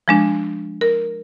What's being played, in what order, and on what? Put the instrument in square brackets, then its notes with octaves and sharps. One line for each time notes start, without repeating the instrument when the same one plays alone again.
[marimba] F3 G#3 D4
A#4